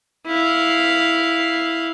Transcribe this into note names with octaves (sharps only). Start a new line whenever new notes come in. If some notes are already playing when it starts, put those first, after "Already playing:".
E4 F5